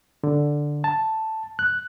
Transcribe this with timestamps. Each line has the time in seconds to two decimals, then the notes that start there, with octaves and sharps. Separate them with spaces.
0.24 D3
0.84 A5
1.59 F#6